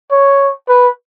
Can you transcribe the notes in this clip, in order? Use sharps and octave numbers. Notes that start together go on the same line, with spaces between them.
C#5
B4